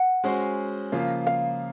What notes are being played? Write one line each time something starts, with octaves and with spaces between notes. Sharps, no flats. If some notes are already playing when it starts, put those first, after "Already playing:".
Already playing: F#5
G#3 C#4 F#4 C5
C#3 F3 A#3 F4
F5